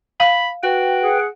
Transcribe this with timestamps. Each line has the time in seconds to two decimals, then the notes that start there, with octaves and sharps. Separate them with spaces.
0.20 F5 B5
0.63 F#4 B4 G5
1.02 G#4 F#5